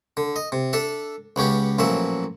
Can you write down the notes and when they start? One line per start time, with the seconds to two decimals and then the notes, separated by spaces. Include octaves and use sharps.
0.17 D3
0.36 D#5
0.52 C3
0.73 D4 A4 E5
1.36 C#2 B3 C#4 G4
1.79 A1 A#2 F3 F#3 E5